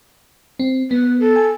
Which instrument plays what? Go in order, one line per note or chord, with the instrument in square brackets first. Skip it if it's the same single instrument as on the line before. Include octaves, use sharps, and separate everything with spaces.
[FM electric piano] C4
[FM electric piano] B3 [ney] B4
[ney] A4
[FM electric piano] G#5